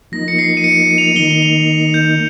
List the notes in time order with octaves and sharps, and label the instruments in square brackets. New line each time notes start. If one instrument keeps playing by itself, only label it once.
[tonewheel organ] F3 A#3 D#4 [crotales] A#6
[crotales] C#7
C7
D#7
C#7
D#7
F7
D#7
[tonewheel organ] D#3 A#3 D#4 [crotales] G7
[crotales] F7
G6